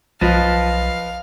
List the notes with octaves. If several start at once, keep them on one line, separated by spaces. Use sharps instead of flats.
B1 F3 B4 D#5 F5 A5